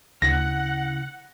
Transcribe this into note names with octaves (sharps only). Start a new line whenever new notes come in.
D2 C#3 E4 F#5 A#6